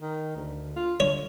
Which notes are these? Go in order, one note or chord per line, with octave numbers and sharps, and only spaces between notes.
D#3
D2
F4
D3 C#5